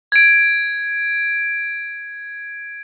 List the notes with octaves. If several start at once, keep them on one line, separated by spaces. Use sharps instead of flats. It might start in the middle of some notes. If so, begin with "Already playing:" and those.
G#6 D7